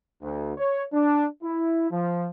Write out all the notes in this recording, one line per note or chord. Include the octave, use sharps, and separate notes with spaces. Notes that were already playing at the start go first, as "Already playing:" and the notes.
D2
C#5
D4
E4
F3